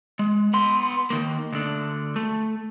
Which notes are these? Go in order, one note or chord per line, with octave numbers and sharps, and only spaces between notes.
G#3
B3 C6
D#3 A#3
D2 D3
A3